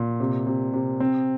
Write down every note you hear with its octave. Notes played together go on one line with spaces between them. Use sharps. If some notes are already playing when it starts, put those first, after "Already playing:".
Already playing: A#2
C3
C3
C3
C4